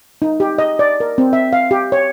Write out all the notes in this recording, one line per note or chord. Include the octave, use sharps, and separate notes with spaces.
D#4
G4
D#5
D5
A#4
C4
E5
F5
G4
C#5